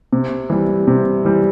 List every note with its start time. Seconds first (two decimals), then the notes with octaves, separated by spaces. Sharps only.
0.13 C3
0.50 E3 G3
0.87 C3
1.25 E3 G3